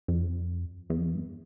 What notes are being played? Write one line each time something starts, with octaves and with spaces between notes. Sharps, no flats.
F2
E2
F2
E2
G2